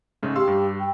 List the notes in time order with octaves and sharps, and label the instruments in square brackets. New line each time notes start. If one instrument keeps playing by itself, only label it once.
[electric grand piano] G#2 C#3 A3
[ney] G4 [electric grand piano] F5 C6 E6
[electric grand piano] G2
[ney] G5